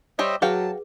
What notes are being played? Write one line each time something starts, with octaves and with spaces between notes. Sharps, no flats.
G3 G4 C5 C#5 D#5 E5
F#3 F#4 G#4 B4 F5 G5 A5